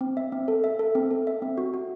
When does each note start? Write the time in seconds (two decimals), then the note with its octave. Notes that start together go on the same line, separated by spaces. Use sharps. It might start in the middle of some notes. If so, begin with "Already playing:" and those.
0.01 C4
0.17 E5
0.32 C4
0.48 A4
0.64 E5
0.79 A4
0.95 C4
1.11 A4
1.27 E5
1.42 C4
1.58 F#4
1.74 F#4